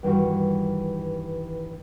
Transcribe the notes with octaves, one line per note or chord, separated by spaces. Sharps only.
G2 D#3 E3 G3 F#4